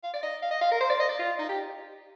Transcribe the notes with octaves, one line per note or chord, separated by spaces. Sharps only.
F5
D5
D#5
F5
D#5
F5
A#4
C5
D5
D#5
D5
F4
D#4
G4